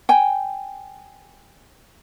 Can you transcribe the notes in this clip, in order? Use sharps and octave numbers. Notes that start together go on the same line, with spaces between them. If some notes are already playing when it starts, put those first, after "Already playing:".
G5 G#5